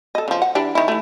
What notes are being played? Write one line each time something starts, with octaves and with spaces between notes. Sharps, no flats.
A4 D#5
C#3 F3
F#5
E3 D4 G4
D#3 E4
E3 A3